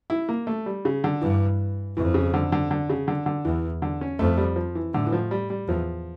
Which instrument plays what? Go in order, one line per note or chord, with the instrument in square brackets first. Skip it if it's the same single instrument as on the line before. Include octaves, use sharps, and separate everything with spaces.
[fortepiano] E4
A#3
A3
G3
C#3
D3
[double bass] G2 [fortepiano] E3
[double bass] F2 [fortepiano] E3
[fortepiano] C#3
D3
D3
D3
C#3
D3
D3
[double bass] E2 [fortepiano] E3
[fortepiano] D3
C#4
[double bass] F2 [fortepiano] A3
[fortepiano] G3
F3
E3
[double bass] A2 [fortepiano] D3
[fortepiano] E3
F3
G3
G3
[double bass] E2 [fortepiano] F3